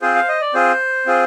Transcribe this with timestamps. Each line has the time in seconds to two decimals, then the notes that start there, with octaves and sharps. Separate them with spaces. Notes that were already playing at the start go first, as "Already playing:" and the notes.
0.02 C4 F4 G#4 C5
0.15 F5
0.28 D#5
0.41 D5
0.54 C4 F4 G#4 C5
1.06 C4 F4 G#4